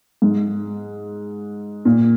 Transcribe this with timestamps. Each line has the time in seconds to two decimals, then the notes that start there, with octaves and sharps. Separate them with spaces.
0.22 G#2
1.85 A#2